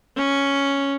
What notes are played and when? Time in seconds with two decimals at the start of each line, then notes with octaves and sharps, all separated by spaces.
0.16 C#4